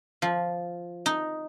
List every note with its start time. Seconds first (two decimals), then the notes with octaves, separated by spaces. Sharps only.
0.22 F3
1.06 D#4